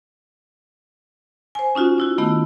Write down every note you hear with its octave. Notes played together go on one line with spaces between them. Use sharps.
C5 G#5
C#4 D#4 F4 F#4
D#4 E4 F#4
D#3 A3 B3 E4